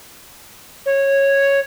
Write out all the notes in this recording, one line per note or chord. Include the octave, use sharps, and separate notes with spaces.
C#5